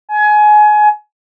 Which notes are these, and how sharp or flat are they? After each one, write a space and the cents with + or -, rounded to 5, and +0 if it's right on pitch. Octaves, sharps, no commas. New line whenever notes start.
G#5 +25